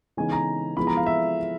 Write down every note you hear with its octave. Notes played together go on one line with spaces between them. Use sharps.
C#3 E3 G#3 B3 D#4 G#5
A#5
F3 G#3 B3 E4 B5
A#5
F5
E5